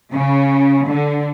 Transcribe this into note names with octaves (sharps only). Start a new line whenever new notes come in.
C#3
D3